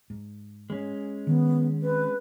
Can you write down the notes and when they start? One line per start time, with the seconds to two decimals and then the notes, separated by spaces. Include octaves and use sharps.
0.10 G#2
0.70 G#3 C#4
1.27 D#3 B3
1.81 C4 B4